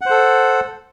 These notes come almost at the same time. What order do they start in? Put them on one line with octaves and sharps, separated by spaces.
F#5 C5 A4